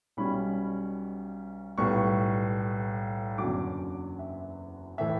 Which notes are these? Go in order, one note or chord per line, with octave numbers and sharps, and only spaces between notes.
B1 B2 G3 C#4 B5
B1 A2 G3 B3 C#6
F#1 E2 D3 F#3 D6
E5
A2 E3 E5